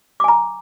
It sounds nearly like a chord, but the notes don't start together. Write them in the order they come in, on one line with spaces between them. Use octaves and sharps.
D6 G#5 A#5